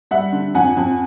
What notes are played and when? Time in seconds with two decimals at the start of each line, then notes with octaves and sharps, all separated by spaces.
0.11 G3 E5 F#5
0.32 D3
0.54 F2 F#5 G#5
0.77 F2